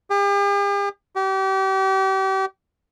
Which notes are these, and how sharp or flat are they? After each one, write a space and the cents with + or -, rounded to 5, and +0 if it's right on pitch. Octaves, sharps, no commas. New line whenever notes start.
G4 +45
G4 -35